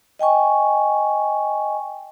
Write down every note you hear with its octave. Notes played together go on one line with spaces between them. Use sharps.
D#5 G5 G#5 C#6